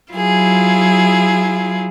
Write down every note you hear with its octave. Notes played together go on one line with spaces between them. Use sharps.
F#3 E4 F4 G#4